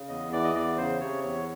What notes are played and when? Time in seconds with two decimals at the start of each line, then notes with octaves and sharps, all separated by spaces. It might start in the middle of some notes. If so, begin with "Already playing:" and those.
Already playing: C#3
0.08 E2 D#5
0.32 E3 D5
0.44 D#5
0.54 E2 D5
0.77 C#3 C5
1.00 C3 C#5
1.23 E2 C#5